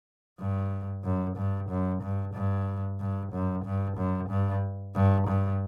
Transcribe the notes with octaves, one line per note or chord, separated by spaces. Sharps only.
G2
F#2
G2
F#2
G2
G2
G2
F#2
G2
F#2
G2
G2
G2